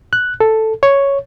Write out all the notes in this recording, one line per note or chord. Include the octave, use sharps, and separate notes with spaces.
F#6
A4
C#5